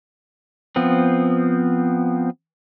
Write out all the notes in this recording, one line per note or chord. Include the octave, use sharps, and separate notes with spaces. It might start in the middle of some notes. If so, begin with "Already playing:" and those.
F3 B3 C4